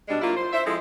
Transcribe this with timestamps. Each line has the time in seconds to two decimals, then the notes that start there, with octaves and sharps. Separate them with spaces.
0.08 B2 G3 G#3 D4
0.22 F#3 A#3 E4 F4
0.36 C5
0.53 C5 E5
0.65 F3 G#3 C4 E4 A4